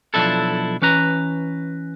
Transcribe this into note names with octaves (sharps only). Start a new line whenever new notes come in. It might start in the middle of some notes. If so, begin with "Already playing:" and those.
B1 F3 D4 E4 A4
E3 C#4 B4 A#5